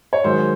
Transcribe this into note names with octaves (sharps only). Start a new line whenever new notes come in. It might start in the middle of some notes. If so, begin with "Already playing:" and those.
C#5
G#2 D#3 F#3 C5